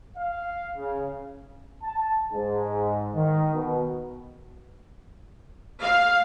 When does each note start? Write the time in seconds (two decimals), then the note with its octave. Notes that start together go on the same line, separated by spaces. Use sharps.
0.16 F5
0.76 C#3
1.83 A5
2.31 G#2
3.14 D#3
3.54 B2
5.81 F5